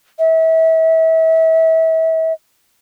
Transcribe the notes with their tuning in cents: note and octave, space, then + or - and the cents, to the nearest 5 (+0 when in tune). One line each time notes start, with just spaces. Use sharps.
E5 -30